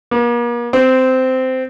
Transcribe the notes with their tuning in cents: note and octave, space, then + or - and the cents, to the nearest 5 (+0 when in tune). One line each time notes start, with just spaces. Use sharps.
A#3 +40
C4 -15